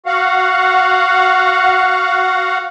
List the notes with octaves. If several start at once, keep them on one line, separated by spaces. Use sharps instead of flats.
F#4 F5 F#5